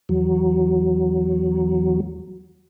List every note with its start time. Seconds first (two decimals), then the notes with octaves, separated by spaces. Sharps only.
0.09 E2 F#3